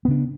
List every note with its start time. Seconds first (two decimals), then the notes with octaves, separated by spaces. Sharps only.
0.05 B3
0.08 C#3
0.11 D4